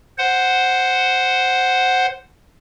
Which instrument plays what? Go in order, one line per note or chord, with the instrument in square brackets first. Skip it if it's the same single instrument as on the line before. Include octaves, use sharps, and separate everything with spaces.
[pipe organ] C5 F#5